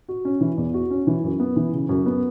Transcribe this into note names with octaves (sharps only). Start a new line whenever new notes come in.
F#4
C#4
E3
E2
F#4
C#4
E3
F#2
B3
E3
C#3
F#2
B3